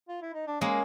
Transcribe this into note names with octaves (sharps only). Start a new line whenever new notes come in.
F4
E4
D#4
D4
G#3 A#3 C#4